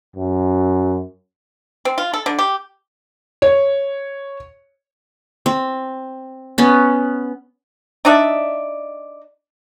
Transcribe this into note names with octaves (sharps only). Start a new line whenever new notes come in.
F#2
C4
F4
A4
D3
G4
C#5
C4
B3 C#4
D4 D#4 D5 E5